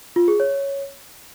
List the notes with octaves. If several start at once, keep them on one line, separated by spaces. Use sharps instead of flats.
F4
G#4
C#5